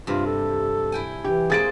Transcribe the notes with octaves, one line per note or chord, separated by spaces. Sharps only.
G2 C3 F4
A4
E4 G5 G#5
E3 G4
G#3 A#3 C4 G#4 A6 D7